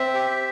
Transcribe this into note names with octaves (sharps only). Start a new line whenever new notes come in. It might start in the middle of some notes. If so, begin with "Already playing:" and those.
Already playing: C4 E5
G4